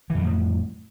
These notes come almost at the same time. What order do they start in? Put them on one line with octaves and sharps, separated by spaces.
E3 F2 F#3 A2